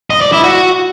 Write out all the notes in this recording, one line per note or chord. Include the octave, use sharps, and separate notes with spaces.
D#5
D5
E4
F#4